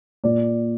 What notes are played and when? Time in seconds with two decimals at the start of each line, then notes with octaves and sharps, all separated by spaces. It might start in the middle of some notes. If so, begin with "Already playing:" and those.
0.24 A#2 D5